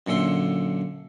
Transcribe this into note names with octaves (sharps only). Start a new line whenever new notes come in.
F#2 A#2 D3 A4 C6